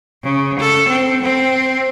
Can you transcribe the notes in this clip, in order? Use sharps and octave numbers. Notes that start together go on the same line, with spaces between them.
C#3
A4
C4
C4